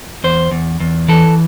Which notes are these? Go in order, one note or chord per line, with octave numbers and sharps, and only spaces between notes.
E2 C5
E2
E2
E3 A4